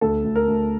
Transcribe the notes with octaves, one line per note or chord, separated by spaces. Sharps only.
D2 A4
D2
A#4
D2